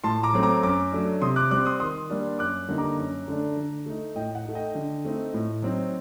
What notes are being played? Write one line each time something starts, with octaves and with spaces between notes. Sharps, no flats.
A2 A5 C6
A#5 D6
F#3 A3 C4
A#5 D6
F#2 A#5 D6
F#3 A3 D4
C3 C6 D#6
D6 F#6
G3 C4 D6 F#6
C6 D#6
D#3 C6 D#6
G3 A#3 D4
F#2 D6 F#6
D3 G3 A#3 D#4
A#5 D6
F#2
D3 A3 D4
D3
A3 D#4
A2 D#5 G5
F#5
A3 D#4
D#5 G5
D3
A3 C4 D#4
A2
F#3 C4 D#4